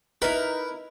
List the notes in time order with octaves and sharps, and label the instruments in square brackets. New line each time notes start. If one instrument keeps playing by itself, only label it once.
[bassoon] D#4 [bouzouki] E4 A#4 [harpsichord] B4